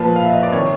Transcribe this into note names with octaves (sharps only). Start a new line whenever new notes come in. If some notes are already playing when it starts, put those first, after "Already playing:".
Already playing: A#2 F3 B4
F5
E5
D#5
D5
C3 D#3 C#5